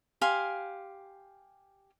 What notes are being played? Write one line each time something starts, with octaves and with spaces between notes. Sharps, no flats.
G4 F5 G#5 C6